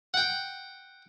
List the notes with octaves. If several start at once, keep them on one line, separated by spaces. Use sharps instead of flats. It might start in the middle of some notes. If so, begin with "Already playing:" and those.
F#5 G5